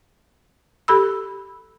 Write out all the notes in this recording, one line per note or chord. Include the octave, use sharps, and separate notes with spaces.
G4 A4 B5 E6